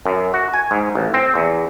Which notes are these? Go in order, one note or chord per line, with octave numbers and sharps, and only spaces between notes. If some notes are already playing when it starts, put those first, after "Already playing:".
F#2
F#4
G#5
G#2
A1
C4
E2